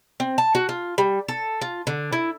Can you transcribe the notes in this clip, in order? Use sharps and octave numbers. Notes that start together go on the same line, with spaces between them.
C4
A5
F#4
F4
G3
A4
F4
D3
E4